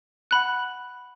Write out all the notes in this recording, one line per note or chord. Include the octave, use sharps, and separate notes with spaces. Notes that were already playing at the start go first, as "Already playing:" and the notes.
F#5 B5 F#6